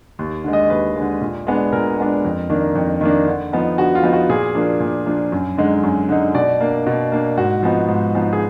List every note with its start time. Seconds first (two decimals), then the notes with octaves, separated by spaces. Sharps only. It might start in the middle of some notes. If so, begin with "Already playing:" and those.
0.19 D#2
0.44 D3 G#3
0.53 D#5
0.70 D#2 B4
0.96 D3 G#3
1.21 A#2
1.47 G#3 B3 D4
1.72 A#2 A#4
1.98 G#3 B3 D4
2.24 F2
2.49 D#3 A#3 D4
2.75 F2
3.01 D#3 A#3 D4
3.27 D3
3.52 F3 B3 D#4
3.78 D3 F#4
3.95 F4
4.03 F3 B3 D#4
4.13 F#4
4.30 A#2 G#4
4.55 F3 A#3 D4
4.80 A#2
5.06 F3 A#3 D4
5.32 F#2
5.57 D3 G#3 D#4
5.83 F#2
6.09 D3 G#3 D#4
6.34 B2 D5
6.60 A#3 D4
6.86 B2
7.12 A#3 D4
7.37 G#2 F#4
7.63 F3 B3 D#4
7.88 G#2
8.15 F3 B3 D#4
8.33 G#4